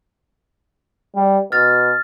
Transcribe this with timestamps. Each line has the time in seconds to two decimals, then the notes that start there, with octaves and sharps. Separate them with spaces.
1.15 G3
1.52 B2 F6 A6